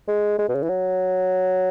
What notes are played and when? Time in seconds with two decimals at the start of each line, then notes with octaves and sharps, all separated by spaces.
0.08 G#3
0.39 G#3
0.49 B2
0.55 C#3
0.63 E3
0.69 F#3